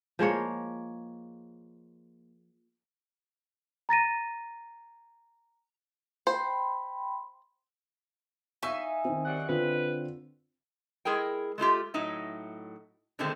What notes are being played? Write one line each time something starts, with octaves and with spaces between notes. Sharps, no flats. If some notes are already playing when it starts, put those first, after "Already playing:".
F3 G#3 A#3 C#5
A#5 A6 A#6 D#7
C5 G5 B5 C6
D#4 E5 F5 G#5 C#6 E6
D#3 C4
F#2 G3 F#5
D3 C4 F4 B4
G#3 E4 G#4 A#4 G5
G#3 A3 F4 G4
A2 F#3 D#4 E5
B2 D3 D#3 G#3 A3 C4